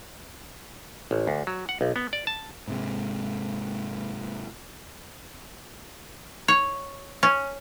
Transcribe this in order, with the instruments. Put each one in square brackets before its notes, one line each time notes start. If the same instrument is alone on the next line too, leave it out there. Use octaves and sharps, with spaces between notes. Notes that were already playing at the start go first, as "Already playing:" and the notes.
[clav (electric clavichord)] A1
D2
F#3
F#5
B1
B3
D5
A5
[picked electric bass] G#2 C3 G#3
[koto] C#5
C#4